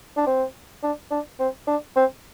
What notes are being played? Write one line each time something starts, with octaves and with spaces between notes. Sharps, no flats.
D4
C4
D4
D4
C4
D4
C4